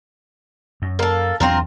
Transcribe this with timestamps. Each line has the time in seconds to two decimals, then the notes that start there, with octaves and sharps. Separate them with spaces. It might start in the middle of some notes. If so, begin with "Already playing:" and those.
0.82 F#2
0.99 A#3 A4
1.40 E2 F#3 C4 D4 F4 A#4